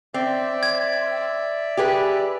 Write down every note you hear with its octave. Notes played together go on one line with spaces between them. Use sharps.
C4 D5 E5
G#6
G4 G#4 B4